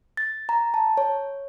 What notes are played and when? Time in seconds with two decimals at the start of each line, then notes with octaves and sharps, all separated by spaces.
0.17 A6
0.49 A#5
0.74 A5
0.97 C#5